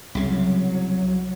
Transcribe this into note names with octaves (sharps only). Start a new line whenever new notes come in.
C2 C#3 F#3